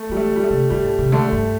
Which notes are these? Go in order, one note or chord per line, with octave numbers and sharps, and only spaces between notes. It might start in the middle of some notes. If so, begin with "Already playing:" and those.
Already playing: A3
E3 G3
A3
D3
G3
A3
C3
D3 G3
A2
C3
D3 A3
G2